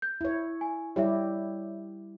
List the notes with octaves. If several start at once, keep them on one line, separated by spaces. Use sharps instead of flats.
G6
E4 C#5
G#5
G3 E4 G4 C#5 E5